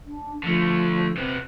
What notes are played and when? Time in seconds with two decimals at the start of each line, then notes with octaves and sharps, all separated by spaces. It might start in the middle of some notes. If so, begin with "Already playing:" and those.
0.07 D4
0.43 D3 F3 A3
1.17 C3 B3 C4